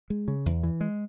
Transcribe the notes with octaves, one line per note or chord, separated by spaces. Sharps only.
G#3
C#3
E2
E3
G#3